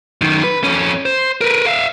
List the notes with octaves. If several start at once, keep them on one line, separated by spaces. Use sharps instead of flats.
F#2 D#3
B4
F2 C#4
C5
A#4 B4
E5 F5